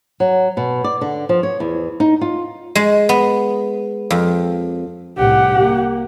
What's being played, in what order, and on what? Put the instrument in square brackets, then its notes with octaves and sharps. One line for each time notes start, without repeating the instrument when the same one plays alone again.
[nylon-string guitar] F#3
B2
D5
D3
F3
C#5
E2
D#4
F4
[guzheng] G#3
B3
F2
[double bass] C2 A2 [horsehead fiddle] G4 F#5
[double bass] A#3